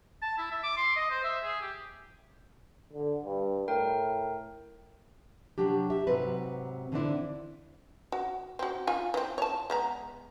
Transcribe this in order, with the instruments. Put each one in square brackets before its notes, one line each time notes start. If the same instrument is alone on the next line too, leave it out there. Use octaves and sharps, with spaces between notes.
[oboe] A5
E4
E5
D6
C6
D#5
C5
E5
G#4
G4
[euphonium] D3
G2
[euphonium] A2 [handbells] A#4 G5
[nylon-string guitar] C3 F#3 D4 G4
G4 E5
G#2 C3 F#3 C4 B4
D3 E3 B3 C4 D4 E4
[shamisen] F#4
C4 F#4
F4 G#5
E3 C4
C#5 A5
G#3 B3 A#5